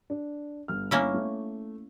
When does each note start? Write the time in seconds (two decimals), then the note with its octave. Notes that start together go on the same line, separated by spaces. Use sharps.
0.10 D4
0.68 G1 F6
0.91 A#3 C#4 E4
1.14 A3